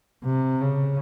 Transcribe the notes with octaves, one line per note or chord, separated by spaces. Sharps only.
C3
C#3